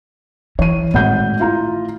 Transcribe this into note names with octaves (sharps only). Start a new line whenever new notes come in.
E3 C#5 D#7
G#1 A2 F#5 G6
E4 F4 A#5